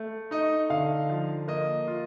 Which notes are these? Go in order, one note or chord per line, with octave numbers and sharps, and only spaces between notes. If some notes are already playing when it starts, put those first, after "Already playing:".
Already playing: A3
D#4 D#5
D3 F5
F3
A#3 D#5
F4